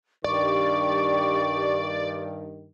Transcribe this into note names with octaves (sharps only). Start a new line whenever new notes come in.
G2 D#3 G4 D5 C#6